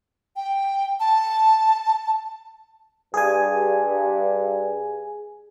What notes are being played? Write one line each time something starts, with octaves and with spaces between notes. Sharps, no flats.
G5
A5
G2 G#4 G#5